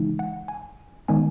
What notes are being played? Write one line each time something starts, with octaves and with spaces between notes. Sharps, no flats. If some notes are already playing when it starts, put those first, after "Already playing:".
Already playing: C#3 E3 G#3 D#4
F#5
G#5
D#3 G#3 B3 D#4 G#5